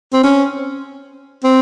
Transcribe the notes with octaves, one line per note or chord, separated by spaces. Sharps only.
C4
C#4
C4